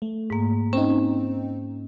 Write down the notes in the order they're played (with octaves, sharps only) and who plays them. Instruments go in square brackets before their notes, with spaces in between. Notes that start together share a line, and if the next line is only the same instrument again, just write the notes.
[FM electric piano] A3
[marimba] G#2 A#3
[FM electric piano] C4 D#4 [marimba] C#4